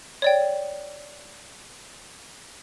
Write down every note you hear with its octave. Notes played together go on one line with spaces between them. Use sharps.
C#5 D5 G5